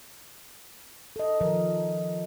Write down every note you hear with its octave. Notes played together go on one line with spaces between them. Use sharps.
A4 D#5
D#3 F3 A#4